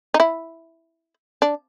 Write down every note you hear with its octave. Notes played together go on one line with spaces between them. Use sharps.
D#4
E4
D4